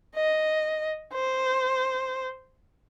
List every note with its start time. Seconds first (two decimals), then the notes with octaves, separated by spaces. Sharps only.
0.15 D#5
1.14 C5